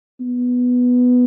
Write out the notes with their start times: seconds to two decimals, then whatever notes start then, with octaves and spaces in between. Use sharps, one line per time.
0.20 B3